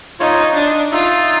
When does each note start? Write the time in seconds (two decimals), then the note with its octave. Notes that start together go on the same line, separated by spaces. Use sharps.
0.20 D#4 F4 C#5
0.55 D4 D#6
0.92 D#4 F4 E5